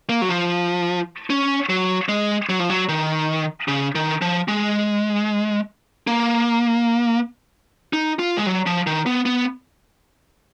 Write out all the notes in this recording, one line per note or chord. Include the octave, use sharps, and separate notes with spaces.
A#3
F#3
F3
C#4
F#3
G#3
F#3
F3
F#3
D#3
C#3
D#3
F3
G#3
A#3
D#4
F4
G#3
F#3
F3
D#3
B3
B3